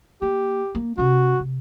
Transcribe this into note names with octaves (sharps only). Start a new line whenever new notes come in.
A#3 G4
A#3
C3 C#4 F#4
C3